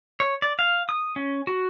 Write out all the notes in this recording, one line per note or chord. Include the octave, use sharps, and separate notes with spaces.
C#5
D5
F5
D#6
C#4
F#4